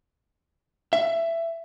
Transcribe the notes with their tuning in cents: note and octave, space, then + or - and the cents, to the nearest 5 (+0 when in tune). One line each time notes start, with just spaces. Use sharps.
E5 +15